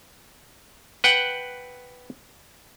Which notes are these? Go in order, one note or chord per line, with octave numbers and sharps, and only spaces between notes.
B4 F#5 G5